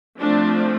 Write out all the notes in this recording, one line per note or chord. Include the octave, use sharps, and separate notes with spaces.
F3 A3 C4 D4